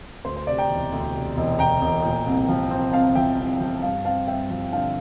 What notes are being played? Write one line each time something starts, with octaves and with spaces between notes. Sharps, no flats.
D2 C5
C5
C3 D5
G5 A#5
E1
D2
C3
E1
E1 G5 A#5
E1
A#2
C2
F3
C4
C2 F5 A5
F3 E5 G5
C2
F3
G2 F5 A5
C4 F5 A5
G2 E5 G5
F3
D3 F5 A5